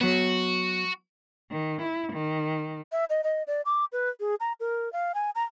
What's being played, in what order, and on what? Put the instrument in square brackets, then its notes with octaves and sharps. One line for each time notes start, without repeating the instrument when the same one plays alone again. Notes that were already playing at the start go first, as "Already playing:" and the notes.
[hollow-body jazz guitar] F#3 B3 [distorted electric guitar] F#4
[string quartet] D#3
E4
D#3
[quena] E5
D#5
D#5
D5
D6
B4
G#4
A#5
A#4
F5
G#5
A#5